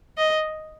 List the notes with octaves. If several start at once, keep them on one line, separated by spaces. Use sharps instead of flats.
D#5